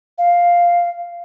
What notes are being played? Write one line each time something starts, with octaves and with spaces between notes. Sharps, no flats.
F5